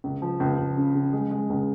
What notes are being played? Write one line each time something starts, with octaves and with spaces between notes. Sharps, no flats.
C#2
F3
C#2
C#2
C#3
C#3
G#3
G#3
C#2